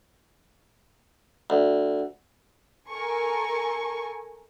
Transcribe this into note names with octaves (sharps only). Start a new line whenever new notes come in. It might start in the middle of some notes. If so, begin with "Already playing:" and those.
D2
A4 A#4 G#5 C#6